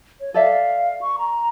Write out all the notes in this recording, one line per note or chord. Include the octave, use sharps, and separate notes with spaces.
C#5
A4 D5 E5 F5
C#6
A#5